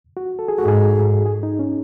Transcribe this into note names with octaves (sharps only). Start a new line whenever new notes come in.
F#4
A4
G#4
G#2 F#4
G#4
G#4
D#4
C#4